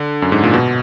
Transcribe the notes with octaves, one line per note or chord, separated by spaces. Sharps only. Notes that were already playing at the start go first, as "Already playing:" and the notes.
Already playing: D3
F#2
G#2
A#2
B2